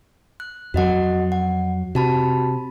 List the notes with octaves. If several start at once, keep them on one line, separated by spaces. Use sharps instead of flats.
F#6
F2 F#3 F#4 D#5 F#5
F#5
C3 F#4 A5 B5